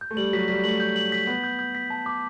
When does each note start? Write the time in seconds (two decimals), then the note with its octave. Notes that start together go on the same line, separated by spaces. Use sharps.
0.01 G6
0.11 A3
0.17 G3 F#7
0.33 F#3 B6
0.48 G3 B6
0.64 A3 F#7
0.80 G6
0.96 F#7
1.12 B6
1.27 B3 B6
1.44 G6
1.59 G6
1.75 B6
1.90 A5
2.06 D6